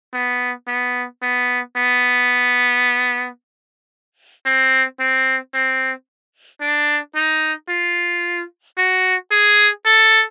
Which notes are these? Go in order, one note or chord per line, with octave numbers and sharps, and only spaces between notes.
B3
B3
B3
B3
C4
C4
C4
D4
D#4
F4
F#4
G#4
A4